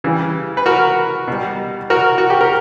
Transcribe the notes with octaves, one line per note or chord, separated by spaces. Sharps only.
C#3 E3 G3
B4
F#4 A#4
B2 G3
F#4 A#4
F#4
G4
A#4